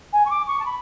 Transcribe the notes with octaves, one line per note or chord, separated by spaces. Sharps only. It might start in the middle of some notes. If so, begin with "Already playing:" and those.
G#5
C#6
D6
C#6
A5
B5